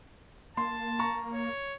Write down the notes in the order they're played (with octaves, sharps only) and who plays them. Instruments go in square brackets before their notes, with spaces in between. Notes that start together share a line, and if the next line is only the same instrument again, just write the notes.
[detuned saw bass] A#3 [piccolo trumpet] A5 [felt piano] C6
[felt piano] A#5 C#6
[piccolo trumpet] C#5